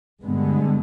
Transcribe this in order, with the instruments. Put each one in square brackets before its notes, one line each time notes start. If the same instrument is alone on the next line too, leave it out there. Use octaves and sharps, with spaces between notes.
[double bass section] G2 D3 G#3 B3